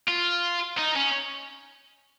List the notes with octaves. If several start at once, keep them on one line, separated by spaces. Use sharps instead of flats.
F4
D#4
C#4